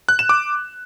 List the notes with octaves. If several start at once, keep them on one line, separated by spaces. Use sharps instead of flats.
F#6
E7
D6